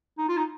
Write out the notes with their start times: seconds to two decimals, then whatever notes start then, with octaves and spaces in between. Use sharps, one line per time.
0.18 D#4
0.29 F4
0.37 D#4